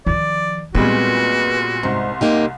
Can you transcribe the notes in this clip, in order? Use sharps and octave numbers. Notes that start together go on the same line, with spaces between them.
D#3 F3 D5
A#2 G3 G#3 B3 C4 F#4 B4
C2 G#2 C6
A#3 D#4 G4